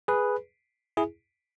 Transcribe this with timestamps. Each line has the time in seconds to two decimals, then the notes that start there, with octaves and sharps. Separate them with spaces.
0.08 G#4 B4
0.97 E4 G#4